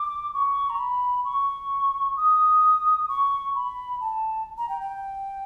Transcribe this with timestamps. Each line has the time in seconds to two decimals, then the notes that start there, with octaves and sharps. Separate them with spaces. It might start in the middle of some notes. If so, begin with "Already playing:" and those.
Already playing: D6
0.34 C#6
0.70 A#5
0.79 B5
1.25 C#6
2.17 D#6
3.09 C#6
3.55 B5
4.01 A5
4.58 A#5
4.69 G5
4.81 G5